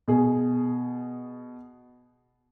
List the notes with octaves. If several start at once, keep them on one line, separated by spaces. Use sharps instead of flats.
B2 G#4